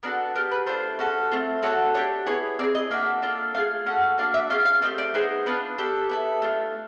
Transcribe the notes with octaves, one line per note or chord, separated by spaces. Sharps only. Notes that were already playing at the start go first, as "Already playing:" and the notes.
B3 D4 F#4 A4 A#4
B3 D4 G4 A#4
B4
A3 D4 F4 C5
C#4 F#4 A4
A3 C4 F4
A3 D4 F#4 A4 C#5
D4 G4 C#5
B3 E4 G#4 C#5
C4 D#4 G#4 D5
D#5
A#3 D4 F#4 E5
A#3 D4 F4 A4
A3 D4 F4 G#4 F5
C#4 F#4 A4 F#5
A#3 D4 F#4 F5
E5
C#4 F4 G#4 F5
F5
A3 C4 G4 D#5
D5
B3 D#4 G#4 C5
B3 D4 F4 B4
D4 G4 A4
B3 E4 A4
A3 D4 F4